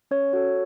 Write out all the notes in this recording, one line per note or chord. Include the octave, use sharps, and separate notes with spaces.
C#4 C#5
F#4 A4